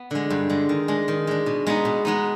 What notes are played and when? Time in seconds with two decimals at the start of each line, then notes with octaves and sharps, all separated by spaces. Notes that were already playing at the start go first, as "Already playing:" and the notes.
Already playing: B3
0.11 D3 G#3
0.30 G2
0.50 D3 G#3
0.69 D#3
0.88 G#3 D4
1.08 D#3
1.27 G#3 D4
1.46 B2
1.67 G#3 B3 D#4
1.85 B2
2.05 G#3 B3 D#4